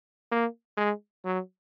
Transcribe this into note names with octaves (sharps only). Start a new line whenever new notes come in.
A#3
G#3
F#3